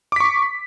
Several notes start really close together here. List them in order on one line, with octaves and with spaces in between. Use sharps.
D6 B6 C#6